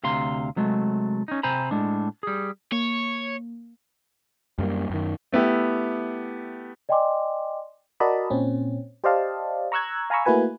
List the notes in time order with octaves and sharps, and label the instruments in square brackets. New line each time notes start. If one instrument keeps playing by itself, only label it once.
[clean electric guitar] D2 C3 F5 A#5 C6
C3 F#3 G#3 A3
C#4 D#4
C3 C4 C5 G#5 A#5 B5
A2 G#3 D4
G3 G#4
[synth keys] A#3 [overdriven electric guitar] C#5
[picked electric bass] F#2 G3 A3 A#3
F#2 D#3
[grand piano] A3 B3 E4 G4
[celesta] D5 D#5 G5 G#5 C6 D6
[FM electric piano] F#4 A#4 D5 D#5 A5 B5
A#2 C4 C#4
G4 C5 D5 D#5 F5 A5
A#5 C#6 E6 F#6 G#6
F5 G#5 A#5 B5 C#6 E6
A3 A#3 E4 F#4 B4 G#5